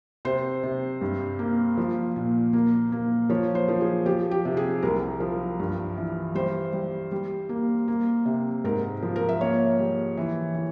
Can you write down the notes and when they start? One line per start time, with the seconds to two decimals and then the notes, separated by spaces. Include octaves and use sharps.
0.25 C3 C5
0.63 C3
1.01 G2
1.39 A#3
1.78 F3
2.16 A#2
2.53 A#3
2.92 A#3
3.30 F3 C#5
3.55 C5
3.68 F3
3.81 G#4
4.06 F3 G4
4.31 G4
4.45 C3
4.57 G#4
4.82 C2 A#4
5.20 F3
5.60 G2
5.97 E3
6.35 G3 C5
6.73 G3
7.12 G3
7.49 A#3
7.88 A#3
8.26 C3
8.64 G#2 A#4
9.03 F3
9.16 A#4
9.29 E5
9.41 A#3 C#5
9.79 G3
10.17 E3
10.54 E3